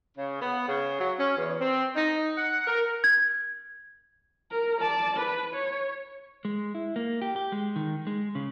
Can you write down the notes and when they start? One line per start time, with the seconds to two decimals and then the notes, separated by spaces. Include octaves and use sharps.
0.16 C#3
0.40 B3
0.68 C#3
0.99 F#3
1.19 C#4
1.36 E2
1.60 C4
1.95 D#4
2.37 F#5
2.67 A#4
3.04 G#6
4.51 A#4
4.80 D5 A5
5.17 B4
5.55 C#5
6.45 G#3
6.75 E4
6.96 A#3
7.22 G4
7.36 G4
7.52 G#3
7.76 D#3
8.07 G#3
8.35 C#3